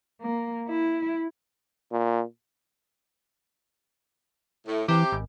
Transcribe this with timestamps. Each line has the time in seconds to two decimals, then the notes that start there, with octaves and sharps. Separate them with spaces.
0.21 A#3
0.69 E4
1.92 A#2
4.67 A2
4.89 C3 E3 G4
5.12 G#1